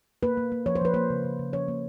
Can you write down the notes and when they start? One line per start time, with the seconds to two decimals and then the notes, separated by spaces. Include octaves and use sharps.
0.23 A#3 B4
0.37 A#3
0.52 A#3
0.66 F3 C#5
0.75 C5
0.81 F3 B4
0.94 A#3 C5
1.10 C#3
1.24 C#3
1.39 C#3
1.53 F3 C#5
1.68 A#3